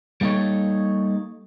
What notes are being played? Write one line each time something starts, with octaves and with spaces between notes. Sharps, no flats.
G3 A#3 D#4 A4 C#5